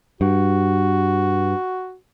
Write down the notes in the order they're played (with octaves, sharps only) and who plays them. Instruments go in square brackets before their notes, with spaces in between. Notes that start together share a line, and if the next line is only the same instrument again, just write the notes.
[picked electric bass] G2 [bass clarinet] F#4